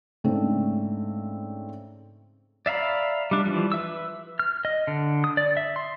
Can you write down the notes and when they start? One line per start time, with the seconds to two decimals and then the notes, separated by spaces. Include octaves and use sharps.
0.24 G#2 C#3 A3 C4 D4
2.66 D5 E5 F5 A#5 B5
3.31 G3 D4
3.46 E3 F3 G3
3.72 B4 E5 E6
4.39 F6
4.65 D#5
4.87 D3
5.24 D#6
5.37 D5
5.57 E5
5.76 C6